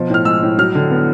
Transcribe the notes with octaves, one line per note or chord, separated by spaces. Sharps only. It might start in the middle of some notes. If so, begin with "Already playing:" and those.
Already playing: B2 F3
A2 F6
G#3 E6
A2
F#3 F6
D3
B3